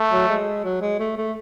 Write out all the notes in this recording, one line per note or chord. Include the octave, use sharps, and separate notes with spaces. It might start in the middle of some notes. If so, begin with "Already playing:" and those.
Already playing: A3
F#3
G#3
F#3
G#3
A3
A3